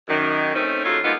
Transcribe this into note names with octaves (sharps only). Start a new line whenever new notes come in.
F#2 D#3
A3 C4 C#4 D#4
D#2 C#4 F4 F#4 A4
G#3 A#3 B3 D#4 F4